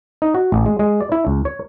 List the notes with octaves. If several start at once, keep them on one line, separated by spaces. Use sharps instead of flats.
D#4
F#4
A1
G#3
G#3
D5
E4
C#2
C#5